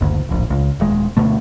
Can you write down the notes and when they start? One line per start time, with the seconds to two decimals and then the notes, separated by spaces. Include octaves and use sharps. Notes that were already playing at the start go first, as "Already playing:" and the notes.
0.01 F#1 D2
0.29 D1 A#1
0.50 C#2
0.80 D#1 G#3
1.17 D2 B2 A3